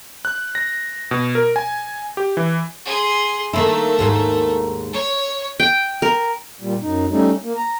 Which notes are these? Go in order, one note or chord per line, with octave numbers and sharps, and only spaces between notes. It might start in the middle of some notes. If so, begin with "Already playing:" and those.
F#6
A#6
B2
A#4
G#5
G4
E3
G#4 C6
D#3 A3 A#3 E4
D#2 G#2 A#3
C#5
G5
A#4
A#2 G3
F#2 D#4
G3 A3 C#4 D#4
A#3
A#5